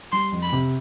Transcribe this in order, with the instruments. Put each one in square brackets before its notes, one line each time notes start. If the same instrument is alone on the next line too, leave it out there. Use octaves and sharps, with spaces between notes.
[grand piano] G3 [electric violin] C6
[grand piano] F2
[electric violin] B5
[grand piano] C3